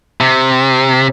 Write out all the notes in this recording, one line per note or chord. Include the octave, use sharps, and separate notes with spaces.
C3